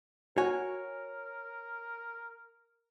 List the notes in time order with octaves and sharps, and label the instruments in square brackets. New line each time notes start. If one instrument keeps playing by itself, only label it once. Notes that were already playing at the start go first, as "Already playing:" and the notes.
[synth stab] F#4 [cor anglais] A#4 [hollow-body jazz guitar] C#5 G#5